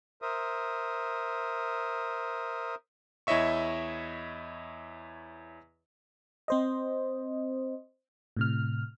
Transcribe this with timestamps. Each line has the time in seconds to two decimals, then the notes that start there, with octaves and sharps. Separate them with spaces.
0.22 A#4 C5 E5 D#6
3.27 E2 E4 C#5 D#5 E5 C#6
6.48 C4 C5 D#5
8.37 A2 C3 F6